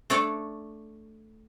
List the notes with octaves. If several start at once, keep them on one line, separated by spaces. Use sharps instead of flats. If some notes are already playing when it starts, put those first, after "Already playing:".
A3 D4 A4 C#5 D5